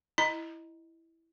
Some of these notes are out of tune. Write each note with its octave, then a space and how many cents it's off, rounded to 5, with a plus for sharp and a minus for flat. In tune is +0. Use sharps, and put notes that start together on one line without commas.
E4 +0 D#5 +0 A#5 +15